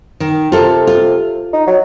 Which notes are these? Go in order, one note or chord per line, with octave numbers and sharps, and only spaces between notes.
D#3
C3 F4 A4 A#4
F4
D#4
F#3